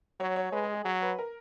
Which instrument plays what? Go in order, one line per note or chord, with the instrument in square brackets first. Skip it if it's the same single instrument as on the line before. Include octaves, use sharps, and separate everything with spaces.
[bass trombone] F#3 [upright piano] C#5
[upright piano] C#5
[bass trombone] G#3 [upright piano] B4
[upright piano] G#4
G#4
[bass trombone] F#3 [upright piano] C#5
[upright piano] B4
A#4